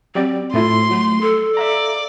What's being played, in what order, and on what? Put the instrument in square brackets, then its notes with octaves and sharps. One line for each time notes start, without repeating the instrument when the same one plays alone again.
[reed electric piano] F#3 G4 D5 [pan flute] C4
[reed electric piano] A2 A3 E4 [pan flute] F4 [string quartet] C6
[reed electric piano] F#3 [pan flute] A3
[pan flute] A4
[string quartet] D5 [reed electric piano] E5 F5 A#5